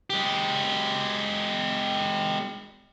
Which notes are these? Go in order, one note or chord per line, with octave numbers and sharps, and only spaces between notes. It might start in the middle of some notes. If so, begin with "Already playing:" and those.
G#3 G4